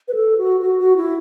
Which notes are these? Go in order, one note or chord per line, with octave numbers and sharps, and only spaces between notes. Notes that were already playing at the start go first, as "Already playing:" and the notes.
B4
A4
F#4
F#4
F#4
E4